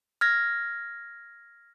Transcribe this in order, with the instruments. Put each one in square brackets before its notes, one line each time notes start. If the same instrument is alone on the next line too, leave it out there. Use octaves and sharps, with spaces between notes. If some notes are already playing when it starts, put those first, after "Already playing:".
[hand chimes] F6 G#6 A#6